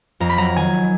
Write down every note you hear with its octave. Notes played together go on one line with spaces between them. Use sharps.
F2 A#5
B5
F#3 A#5
D#3 G#5